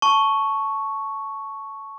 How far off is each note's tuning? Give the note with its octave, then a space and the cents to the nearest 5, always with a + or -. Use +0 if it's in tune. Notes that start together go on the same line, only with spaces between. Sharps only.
A5 +0 C#6 +0